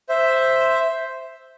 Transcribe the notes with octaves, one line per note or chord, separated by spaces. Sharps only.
C5 E5